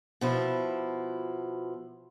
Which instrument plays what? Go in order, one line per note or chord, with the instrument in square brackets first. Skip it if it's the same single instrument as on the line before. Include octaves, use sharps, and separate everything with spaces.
[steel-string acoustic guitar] B2 F3 E4